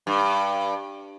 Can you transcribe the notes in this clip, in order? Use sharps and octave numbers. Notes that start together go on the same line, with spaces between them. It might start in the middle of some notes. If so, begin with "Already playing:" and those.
G2